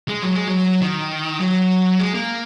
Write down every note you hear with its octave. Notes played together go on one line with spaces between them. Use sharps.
G#3
F#3
G#3
F#3
D#3
F#3
G#3
A#3